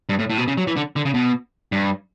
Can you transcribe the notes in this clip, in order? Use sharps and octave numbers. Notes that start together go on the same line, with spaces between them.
G2
A2
A2
B2
C#3
F#3
E3
D3
D3
C#3
B2
G2